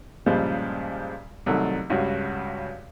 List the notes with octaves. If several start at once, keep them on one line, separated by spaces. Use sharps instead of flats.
G2 A#2 C#3 F3 G3 G#3
C2 D#3 F#3 A3
C#2 G2 F#4